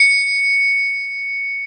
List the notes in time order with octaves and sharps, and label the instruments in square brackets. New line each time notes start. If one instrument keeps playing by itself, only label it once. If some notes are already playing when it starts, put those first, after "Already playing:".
Already playing: [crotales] C#7